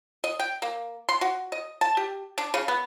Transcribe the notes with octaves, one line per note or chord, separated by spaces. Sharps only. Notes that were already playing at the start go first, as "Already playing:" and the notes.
D#5
G5
A#3
C6
F#4
D#5
A5
G4
D4
C#3
B3